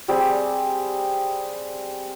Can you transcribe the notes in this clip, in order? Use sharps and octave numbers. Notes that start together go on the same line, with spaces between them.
G3 C4 G4 G#4